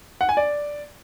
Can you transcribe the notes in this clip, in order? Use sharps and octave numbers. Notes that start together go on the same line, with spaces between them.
F#5
G#5
D5